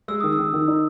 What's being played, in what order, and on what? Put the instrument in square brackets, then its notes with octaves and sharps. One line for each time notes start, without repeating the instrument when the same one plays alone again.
[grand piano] G#3 [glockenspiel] E6
[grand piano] D#3 [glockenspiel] D#6
[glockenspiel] E6
[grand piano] D#3
D#3
D#4